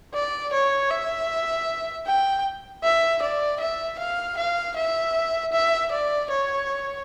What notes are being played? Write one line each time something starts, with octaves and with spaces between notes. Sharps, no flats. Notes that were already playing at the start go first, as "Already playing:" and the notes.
D5
C#5
E5
G5
E5
D5
E5
F5
F5
E5
E5
D5
C#5